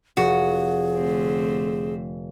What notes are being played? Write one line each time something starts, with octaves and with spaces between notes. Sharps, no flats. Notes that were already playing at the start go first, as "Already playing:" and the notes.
F1 F#4 G#4
D3 A3 C4